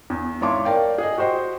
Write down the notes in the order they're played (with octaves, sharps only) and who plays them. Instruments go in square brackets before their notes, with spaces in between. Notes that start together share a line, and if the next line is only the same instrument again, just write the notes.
[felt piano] E2
G#1 E4 C#5 A5 C6 D6
A#4 C#5 D5 F5 G5
G#4 D#5
F#4 G4 C5 D#5